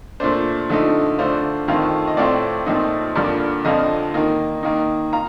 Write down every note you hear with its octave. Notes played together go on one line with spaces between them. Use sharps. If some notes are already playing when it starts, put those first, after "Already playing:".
A#2 A3 D4 C5
D3 F3 A3 D#4
D3 A3 D4 F4 C5
F2 D#3 A3 C4 F4
D#5
A2 A3 C4 F4 D5
A#2 F3 A3 C4 D#4
G2 D3 F3 A#3 D5
F2 D3 F3 C4 F4 D#5
D#3 A#3 D#4
D#3 A#3 D#4
F4 A#5